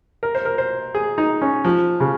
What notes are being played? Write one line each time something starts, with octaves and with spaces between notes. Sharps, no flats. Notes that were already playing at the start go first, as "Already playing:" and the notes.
A#4
C5
A#4
C5
G#4
D#4
C#4
F3
C#3